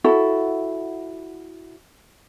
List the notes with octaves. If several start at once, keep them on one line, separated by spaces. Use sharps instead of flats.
E4 F#4 A4